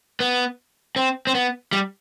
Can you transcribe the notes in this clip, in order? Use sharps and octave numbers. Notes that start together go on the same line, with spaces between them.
B3
C4
C4
B3
G3